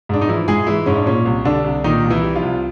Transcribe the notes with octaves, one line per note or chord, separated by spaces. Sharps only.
G#2 D4
D#4
E3 F3 E4
G#2 G#3 G#4
E3 G#3 E4
G#2 C#4
D4
A#2 C#4
C2
D3 G3 D4
C2
A#2 D#3 D#4
C2
E3 E4
G3
F3 F4
C2